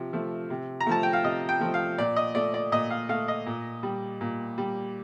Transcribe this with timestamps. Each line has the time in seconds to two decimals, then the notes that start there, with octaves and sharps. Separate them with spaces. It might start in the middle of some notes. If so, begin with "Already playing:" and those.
Already playing: C3 F3
0.13 F3 A3
0.50 C3
0.80 A#5
0.87 F3 A3 A5
1.03 G5
1.13 F5
1.24 C3 D#5
1.49 G5
1.61 F3 A3
1.74 F5
1.98 A#2 D5
2.16 D#5
2.35 A3 D5
2.54 D5
2.72 A#2 D#5
2.90 F5
3.09 A3 F5
3.28 D#5
3.46 A#2
3.83 G3
4.21 A#2
4.58 G3